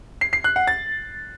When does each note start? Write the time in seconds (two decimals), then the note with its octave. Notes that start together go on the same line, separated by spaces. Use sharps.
0.21 C7
0.33 C7
0.44 F#6
0.56 F#5
0.67 A6